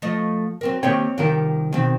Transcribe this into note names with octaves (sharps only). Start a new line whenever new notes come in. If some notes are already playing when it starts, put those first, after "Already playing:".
F3 A3 D#5
F#3 C4 A#4
D#3 A#3 C4 G4 C#5 G5
C2 D#3 F4 G4 A#4
B2 D#3 C4